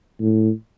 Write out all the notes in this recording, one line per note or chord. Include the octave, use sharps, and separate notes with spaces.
A2